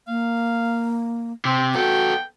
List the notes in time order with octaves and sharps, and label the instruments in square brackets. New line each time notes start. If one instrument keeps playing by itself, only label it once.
[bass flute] A#3 [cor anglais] F5
[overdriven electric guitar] C3 [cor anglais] C4
[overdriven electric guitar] B3 A4 [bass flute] F#4 [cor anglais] G5